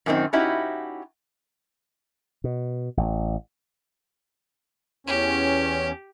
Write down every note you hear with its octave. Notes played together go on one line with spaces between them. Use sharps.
F#2 A#2 D#3 B3 C4 D#4
C#4 D#4 E4 F#4 G4
B2
A1
E2 C#4 G4